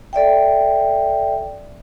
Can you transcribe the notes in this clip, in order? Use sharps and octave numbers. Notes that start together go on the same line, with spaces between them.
A4 D5 E5 G5